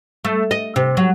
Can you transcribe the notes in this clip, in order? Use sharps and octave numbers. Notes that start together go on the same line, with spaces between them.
A3
D#5
C3
F#3